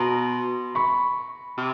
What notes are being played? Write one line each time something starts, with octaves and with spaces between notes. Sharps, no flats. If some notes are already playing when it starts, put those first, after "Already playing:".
Already playing: B2 A#5 C6
B5 C#6
C3